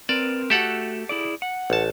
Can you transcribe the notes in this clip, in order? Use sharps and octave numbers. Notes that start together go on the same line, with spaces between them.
C4 A#4 B4 D5
A3 F#4 G4 A4 F#5
E4 G#4 D5
F#5
A1 A5